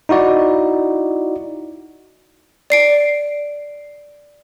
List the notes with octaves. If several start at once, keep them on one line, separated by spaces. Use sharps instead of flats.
D#4 E4 F#4 D5
D5 C7 D7